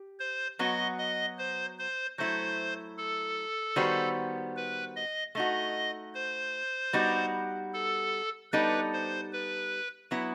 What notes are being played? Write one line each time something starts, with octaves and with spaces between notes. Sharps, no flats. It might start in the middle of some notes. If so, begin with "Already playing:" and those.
Already playing: G4
C5
F#3 B3 F#4 D#5
D#5
C5
C5
F#3 A3 E4 C5
A4
D#3 G3 B3 F#4 C5
B4
D#5
A3 D#4 F#4 D#5
C5
G3 B3 D#4 F#4
A4
G3 B3 D#4 A4 B4
C5
B4
F#3 B3 E4